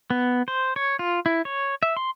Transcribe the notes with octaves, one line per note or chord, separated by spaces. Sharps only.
B3
C5
C#5
F4
E4
C#5
E5
C6